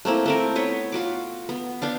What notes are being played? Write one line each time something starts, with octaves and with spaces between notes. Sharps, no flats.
A3 A#3 C4 E4
A3 C4 A#4
B3 B4 C#5
F4 F#4 D6
B3
B3 D4 F5